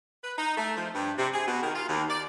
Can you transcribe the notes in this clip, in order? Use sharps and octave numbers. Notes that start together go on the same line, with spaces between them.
B4
D#4
A3
F3
G2
C3
G#4
B2
D#3
F4
D#2
D5